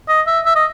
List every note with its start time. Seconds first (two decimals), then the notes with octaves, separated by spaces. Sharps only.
0.08 D#5
0.27 E5
0.45 E5
0.55 D#5